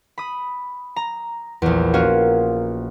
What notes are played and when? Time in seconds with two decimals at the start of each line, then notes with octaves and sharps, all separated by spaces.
0.18 B5 D#6
0.96 A#5
1.62 A#1 E2
1.94 A#3 C#4 F4 F#4